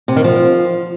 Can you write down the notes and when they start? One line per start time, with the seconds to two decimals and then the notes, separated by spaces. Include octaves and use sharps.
0.08 C3
0.16 D#3
0.24 F3